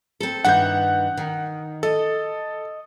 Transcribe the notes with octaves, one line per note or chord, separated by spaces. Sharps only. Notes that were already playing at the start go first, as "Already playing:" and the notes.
C4 A4
G2 D#3 E3 F#5 G6
D#3
A4 D#5